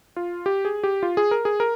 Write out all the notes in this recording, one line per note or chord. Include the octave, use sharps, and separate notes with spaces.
F4
G4
G#4
G4
F4
G#4
A#4
G#4
A#4